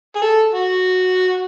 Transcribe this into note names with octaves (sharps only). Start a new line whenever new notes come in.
G#4
A4
F#4